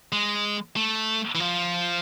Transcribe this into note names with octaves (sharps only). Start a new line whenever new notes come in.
G#3
A3
E3
F3